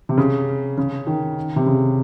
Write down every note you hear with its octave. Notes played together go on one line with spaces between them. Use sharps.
C3
C#3
C#3
D#3
C3
C#3